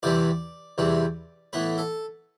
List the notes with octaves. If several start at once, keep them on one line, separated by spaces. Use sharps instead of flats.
E2 C3 E3 G3 D5
E2 C3 E3 G3
A2 E3 B3 B4
A4